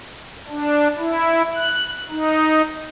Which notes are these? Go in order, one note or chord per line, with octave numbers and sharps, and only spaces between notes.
D4
E4
F#6
D#4